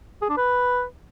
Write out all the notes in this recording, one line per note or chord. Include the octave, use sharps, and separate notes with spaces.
G#4
D4
B4